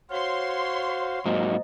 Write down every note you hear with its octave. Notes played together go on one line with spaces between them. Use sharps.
F#4 C5 C#5 F5 C6
G#2 F#3 A#3 C5 D#5 A#5